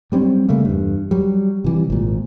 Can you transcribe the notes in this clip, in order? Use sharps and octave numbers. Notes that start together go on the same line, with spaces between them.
F#3 G3 C4 C#4
C#3 G3 A3 A#3
E2 G2
F#3 G3
C3 E3 G3
G#1 A#2